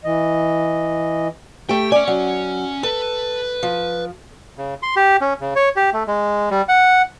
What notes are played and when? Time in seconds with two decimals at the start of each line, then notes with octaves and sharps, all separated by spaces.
0.04 E3 D#5
1.69 A3 G4 G5
1.92 C#4 D5 G#5
2.08 F#3
2.83 A4 B4
3.63 F3
4.58 C#3
4.83 C6
4.96 G4
5.21 C#4
5.41 C#3
5.56 C#5
5.76 G4
5.93 A3
6.08 G#3
6.51 G3
6.69 F#5